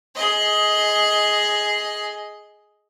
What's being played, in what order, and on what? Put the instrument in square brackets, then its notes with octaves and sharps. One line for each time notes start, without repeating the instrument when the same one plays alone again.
[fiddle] G#4 D#5